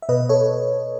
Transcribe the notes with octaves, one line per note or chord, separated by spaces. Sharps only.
E5
B2 B4 D#5
A4 C#5